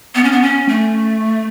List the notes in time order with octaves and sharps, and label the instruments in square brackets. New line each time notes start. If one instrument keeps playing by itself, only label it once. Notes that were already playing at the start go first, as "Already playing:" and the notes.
[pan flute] B3
C#4
B3
C#4
A3